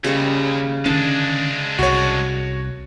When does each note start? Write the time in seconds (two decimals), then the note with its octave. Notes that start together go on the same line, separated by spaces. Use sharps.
0.04 D#2 C#3 G3 C#6
0.86 D3 D#3 G#3 C#4 D4 A5
1.79 C2 F#4 C#5